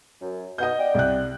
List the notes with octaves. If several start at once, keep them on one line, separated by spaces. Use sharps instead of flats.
F#2
B2 D#4 D#5 F#5 G6
D5 G5
C2 F#6